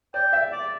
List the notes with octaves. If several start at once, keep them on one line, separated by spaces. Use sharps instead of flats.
D5 G5
E5
D5